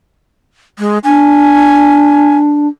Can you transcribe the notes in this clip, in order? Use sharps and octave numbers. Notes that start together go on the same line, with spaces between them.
G#3
D4 G#5